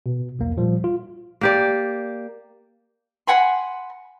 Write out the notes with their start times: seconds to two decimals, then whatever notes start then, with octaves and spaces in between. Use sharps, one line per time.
0.06 B2
0.39 B1 E2 A#3
0.57 A#2 F3 G3
0.84 F4
1.41 A#3 G4 D5
3.27 F#5 G#5 B5 C6